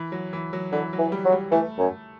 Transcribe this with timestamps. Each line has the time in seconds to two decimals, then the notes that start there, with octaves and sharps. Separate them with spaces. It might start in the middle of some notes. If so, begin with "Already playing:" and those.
Already playing: E3
0.12 F#3
0.33 E3
0.53 F#3
0.72 D3 E3
0.93 F#3
0.99 E3
1.12 G3
1.25 F#3
1.32 G3
1.51 E3 A3
1.78 F#2